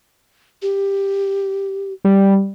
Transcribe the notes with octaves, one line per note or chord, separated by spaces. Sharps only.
G4
G3